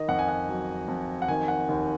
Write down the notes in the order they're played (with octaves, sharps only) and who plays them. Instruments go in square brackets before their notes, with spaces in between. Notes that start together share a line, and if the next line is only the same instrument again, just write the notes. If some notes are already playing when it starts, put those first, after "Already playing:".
Already playing: [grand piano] D#3 D#5
F2 F#5
G#5
F#5
F#3
F2
F#5
D#3 G#5
F#5
D#2